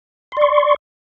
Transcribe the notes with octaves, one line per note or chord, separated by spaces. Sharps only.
D5 C6 C#6